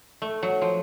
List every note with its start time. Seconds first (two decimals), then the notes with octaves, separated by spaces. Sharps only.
0.22 A3
0.43 F#3
0.62 F3